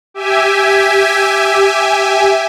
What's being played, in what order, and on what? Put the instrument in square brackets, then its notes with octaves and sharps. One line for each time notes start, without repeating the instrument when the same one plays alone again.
[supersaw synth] G4 E5 G#5